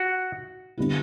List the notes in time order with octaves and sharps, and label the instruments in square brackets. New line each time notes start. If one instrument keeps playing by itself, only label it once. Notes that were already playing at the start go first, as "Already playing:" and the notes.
Already playing: [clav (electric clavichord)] F#4
[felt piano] D3 G3 B3 E4